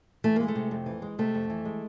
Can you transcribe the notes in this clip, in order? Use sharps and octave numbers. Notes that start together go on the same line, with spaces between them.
E3 A3
G#3 A#3
A3
C3
F2
E3
G#3
C3 A3
F2
E3
G#3